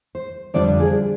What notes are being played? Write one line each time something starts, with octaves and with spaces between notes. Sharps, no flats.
C5
F2 D3 G3 D4 F4 D5
G#4